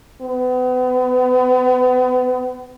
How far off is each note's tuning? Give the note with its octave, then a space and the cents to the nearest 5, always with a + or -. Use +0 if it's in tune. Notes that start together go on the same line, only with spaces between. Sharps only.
B3 +35